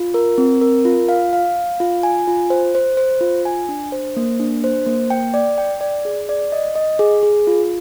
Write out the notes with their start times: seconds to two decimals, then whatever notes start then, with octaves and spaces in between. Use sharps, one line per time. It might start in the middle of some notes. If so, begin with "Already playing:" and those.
Already playing: F4
0.14 A#4
0.38 C4
0.61 A#4
0.85 F4
1.09 F5
1.33 F5
1.56 F5
1.80 F4
2.03 G#5
2.28 F4
2.50 C5
2.75 C5
2.97 C5
3.21 F4
3.45 G#5
3.69 D4
3.92 C5
4.17 A#3
4.40 D4
4.64 C5
4.86 A#3
5.10 G5
5.34 D5
5.58 G5
5.81 D5
6.05 G#4
6.29 D5
6.52 D#5
6.76 D#5
6.99 G#4
7.23 G#4
7.47 F4